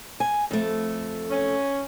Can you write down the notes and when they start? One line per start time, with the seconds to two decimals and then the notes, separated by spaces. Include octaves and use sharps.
0.20 G#5
0.51 F2 A3
1.30 C#4